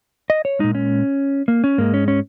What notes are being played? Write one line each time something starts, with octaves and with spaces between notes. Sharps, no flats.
D#5
C#5
A#2 G#3 D#4
C#4
A#3
C#4
G#2 G#3 A#3
C#4
C#4